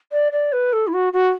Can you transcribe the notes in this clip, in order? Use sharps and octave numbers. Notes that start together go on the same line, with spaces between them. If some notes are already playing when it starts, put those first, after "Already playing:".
D5
D5
B4
A4
E4
F#4
F#4